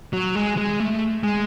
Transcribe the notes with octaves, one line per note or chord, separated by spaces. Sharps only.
F#3
G#3
G#3
A3
G#3